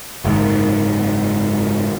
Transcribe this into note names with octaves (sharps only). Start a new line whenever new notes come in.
F#1 G#2 D#3